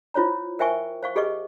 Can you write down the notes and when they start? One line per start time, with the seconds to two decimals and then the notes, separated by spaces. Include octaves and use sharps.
0.14 E4 F4 C5 C#5 A#5
0.59 A#4 C5 E5 G5 G#5 C#6
1.03 C5 F5 C#6
1.16 G4 G#4 B4 D#5 C#6